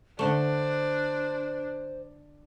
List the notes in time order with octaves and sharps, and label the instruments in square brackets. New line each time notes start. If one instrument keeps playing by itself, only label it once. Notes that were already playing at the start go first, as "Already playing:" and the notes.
[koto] D3 A3 [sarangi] D4 [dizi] C5